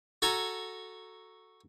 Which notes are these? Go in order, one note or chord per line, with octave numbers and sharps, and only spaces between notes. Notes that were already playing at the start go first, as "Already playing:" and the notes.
F#4 A4 G#5 A#5